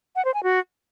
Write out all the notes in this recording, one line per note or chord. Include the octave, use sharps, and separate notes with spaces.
F#5
C5
G#5
F#4